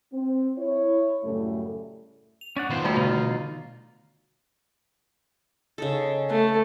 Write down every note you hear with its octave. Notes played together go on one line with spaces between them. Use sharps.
C4
E4 C#5
F#2 A2 C#3 G3 A3
F7
C#4 D5 F#5
B2 D#3 B3 F4 C5
G3 A3 D#4 F#4 G4 A4
B2 D3 D#4 F4
C#3 D#4 A4
A3 B3